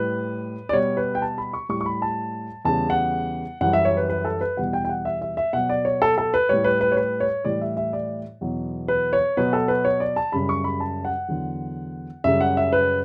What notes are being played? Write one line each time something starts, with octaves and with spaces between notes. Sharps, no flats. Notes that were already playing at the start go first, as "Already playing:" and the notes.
Already playing: A2 G3 B4
D5
B2 G3 C#5
B4
G5
A5
B5
C#6
A2 G3 C#6
C#6
B5
A5
E2 C#3 G3 A5
F#5
F#2 E3 G3 F#5
E5
C#5
B4
B4
A4
B4
E2 B2 G3 F#5
G5
G5
F#5
E5
E5
E5
B2 F#3 F#5
D5
C#5
A4
A4
B4
A2 G3 C#5
B4
B4
C#5
B4
C#5
A2 E3 G3 D5
E5
E5
D5
E2 B2 F#3
B4
C#5
B2 F#3 B4
A4
B4
C#5
D5
A5
F#2 C#3 G3 B5
C#6
B5
A5
F#5
E2 D3 F#3
F#2 C#3 G3 E5
F#5
E5
B4